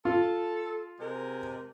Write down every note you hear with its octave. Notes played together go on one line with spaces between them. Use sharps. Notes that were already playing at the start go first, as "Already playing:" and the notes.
F4 A4
C3 G#3 A#4